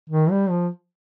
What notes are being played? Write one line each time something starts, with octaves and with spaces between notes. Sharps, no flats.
D#3
G3
F3